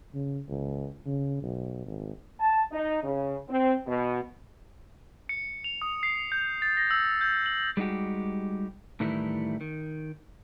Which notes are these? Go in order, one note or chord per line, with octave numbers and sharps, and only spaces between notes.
C#3
C#2
C#3
B1
G#1
A5
D#4
C#3
C4
B2
C#7
F7
D#6
C7
G6
A6
A#6
E6
G6
F#7
G3 G#3 D#4 F#4 G4
A2 D#3 E3 G3 A3 E4
D#3